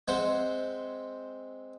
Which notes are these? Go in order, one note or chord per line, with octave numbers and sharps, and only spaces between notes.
G#3 C4 C5 E5 F#5 G#5